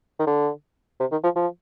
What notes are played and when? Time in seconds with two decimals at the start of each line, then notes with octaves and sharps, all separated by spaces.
0.19 D#3
0.27 D3
1.00 C3
1.12 D#3
1.24 F3
1.36 F3